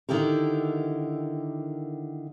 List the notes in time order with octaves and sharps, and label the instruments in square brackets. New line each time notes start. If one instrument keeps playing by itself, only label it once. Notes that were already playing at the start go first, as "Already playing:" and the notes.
[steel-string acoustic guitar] D3 D#3 E4 G4 A#4